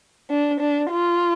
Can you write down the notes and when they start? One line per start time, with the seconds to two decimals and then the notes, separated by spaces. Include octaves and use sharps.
0.30 D4
0.60 D4
0.90 F4